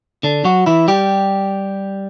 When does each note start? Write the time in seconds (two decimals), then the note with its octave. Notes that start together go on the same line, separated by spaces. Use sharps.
0.23 D3 D4
0.45 F#3 F#4
0.66 E3 E4
0.88 G3 G4